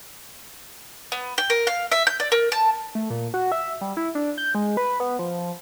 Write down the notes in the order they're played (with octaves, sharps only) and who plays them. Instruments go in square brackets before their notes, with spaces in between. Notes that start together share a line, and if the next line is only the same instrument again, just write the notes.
[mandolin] B3
G5
A#4
F5
E5
G6
D5
A#4
A5
[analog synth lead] A3
A#2
F#4
E5
G3
E4
D4
G6
G#3
B4
B3
F3